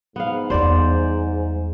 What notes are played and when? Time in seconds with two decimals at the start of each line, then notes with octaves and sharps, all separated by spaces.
0.16 G#2 B3 F5
0.50 E2 G3 C5 D5